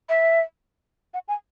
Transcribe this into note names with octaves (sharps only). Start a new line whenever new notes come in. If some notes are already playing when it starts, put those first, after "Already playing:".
E5
F#5
G#5